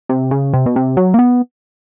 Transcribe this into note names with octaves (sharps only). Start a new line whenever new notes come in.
C3
C#3
C3
B2
C3
F#3
A#3
B3